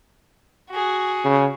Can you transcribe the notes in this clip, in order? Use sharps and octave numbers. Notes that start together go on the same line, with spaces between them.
F#4 G#4
C#3